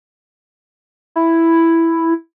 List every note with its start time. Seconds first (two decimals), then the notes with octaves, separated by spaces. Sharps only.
1.16 E4